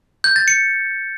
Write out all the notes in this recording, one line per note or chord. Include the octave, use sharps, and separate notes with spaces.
G6
A6
C#7